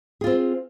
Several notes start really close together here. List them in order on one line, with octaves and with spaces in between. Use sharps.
G#4 F4 C4